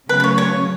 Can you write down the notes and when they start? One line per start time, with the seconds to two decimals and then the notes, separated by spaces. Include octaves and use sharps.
0.08 C#3 F#3 A3 C#4 B4
0.20 B4
0.24 C#5
0.38 C#5